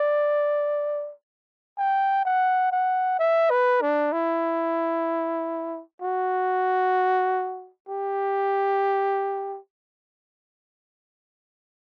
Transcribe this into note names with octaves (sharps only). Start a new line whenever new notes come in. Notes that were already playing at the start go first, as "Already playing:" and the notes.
Already playing: D5
G5
F#5
F#5
E5
B4
D4
E4
F#4
G4